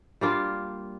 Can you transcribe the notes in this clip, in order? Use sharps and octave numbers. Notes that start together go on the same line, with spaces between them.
G3 A#3 D4 F4